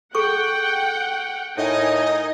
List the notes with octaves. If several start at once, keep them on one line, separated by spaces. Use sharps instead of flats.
G#4 A4 F#5 G5 C#6
A2 D#4 A#4 D#5 G#5